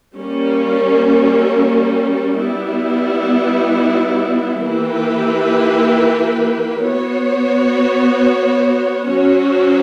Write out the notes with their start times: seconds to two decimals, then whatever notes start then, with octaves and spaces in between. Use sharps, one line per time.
0.16 G3 A#3 C#4
2.40 G3 B3 E4
4.62 E3 A#3 E4 G4 B4
6.85 B3 F#4 C#5
9.07 F#3 C#4 F#4 C#5